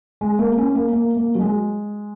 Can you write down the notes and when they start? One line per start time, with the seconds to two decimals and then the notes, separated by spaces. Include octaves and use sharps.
0.21 G#3
0.39 A#3
0.58 C#4
0.75 A#3
0.93 A#3
1.17 A#3
1.35 F#3
1.41 G#3